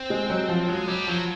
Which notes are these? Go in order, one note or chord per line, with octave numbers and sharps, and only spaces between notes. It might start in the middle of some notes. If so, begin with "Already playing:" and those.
Already playing: C4
G#3
F#3
F3
F#3 G#3
F#3 G3
F3 F#3